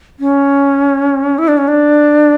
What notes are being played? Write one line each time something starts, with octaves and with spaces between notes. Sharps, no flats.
C#4
E4
D4
C#4
D4